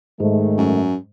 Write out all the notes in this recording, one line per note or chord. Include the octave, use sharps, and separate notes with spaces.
G#2 D#3 G#3 A3
F#2